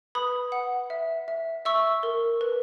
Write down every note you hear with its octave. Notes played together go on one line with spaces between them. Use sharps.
B4 B5 D#6
F#5
E5
E5
E5 C#6 E6
A#4
B4